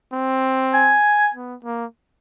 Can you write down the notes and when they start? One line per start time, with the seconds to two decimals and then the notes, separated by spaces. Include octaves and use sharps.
0.13 C4
0.74 G#5
1.34 B3
1.64 A#3